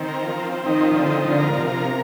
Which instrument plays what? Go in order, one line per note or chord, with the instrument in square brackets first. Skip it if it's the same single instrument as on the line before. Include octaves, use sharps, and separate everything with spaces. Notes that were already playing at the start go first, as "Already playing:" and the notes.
Already playing: [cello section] D#3 [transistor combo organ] C4
[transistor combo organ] A#4
F3
C4
C4
[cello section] D#3 [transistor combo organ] D#4
[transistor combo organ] F3
[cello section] D3 [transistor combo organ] C4
[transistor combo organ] D#4
[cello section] D3 [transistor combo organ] F3
[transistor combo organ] A#4
[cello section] C3 [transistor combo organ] F3
[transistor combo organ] A#4